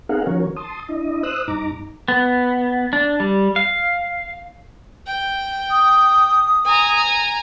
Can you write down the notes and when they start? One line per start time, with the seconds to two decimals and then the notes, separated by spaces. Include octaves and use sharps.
0.09 C4 D#4 G#4 A#4 F5 F#5
0.27 D#3 F3 C#4 F#4 A#4 C#5
0.56 A5 C6 D#6
0.88 D4 E4 D#5
1.23 C5 D#6 E6 F#6
1.48 G2 D#4 A#5 D6
2.08 B3
2.93 D4
3.20 G3
3.56 F5
5.07 G5
5.71 D#6
6.65 G#5 A#5